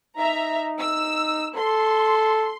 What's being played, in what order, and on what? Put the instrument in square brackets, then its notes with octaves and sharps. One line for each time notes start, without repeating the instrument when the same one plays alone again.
[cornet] D#4 [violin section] E5 A#5
[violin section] E6
[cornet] A4 [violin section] C6